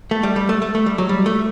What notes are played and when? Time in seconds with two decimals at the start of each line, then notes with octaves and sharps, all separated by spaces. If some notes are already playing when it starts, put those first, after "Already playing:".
0.11 A3
0.23 G3
0.36 G3
0.49 A3
0.62 A3
0.75 A3
0.86 G3
0.98 F#3
1.09 G3
1.26 A3